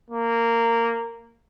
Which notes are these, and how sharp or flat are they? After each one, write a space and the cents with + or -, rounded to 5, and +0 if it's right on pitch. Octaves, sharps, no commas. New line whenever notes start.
A#3 -15